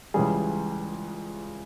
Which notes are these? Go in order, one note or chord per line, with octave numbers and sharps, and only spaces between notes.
C#2 C#3 E3 G3 G#4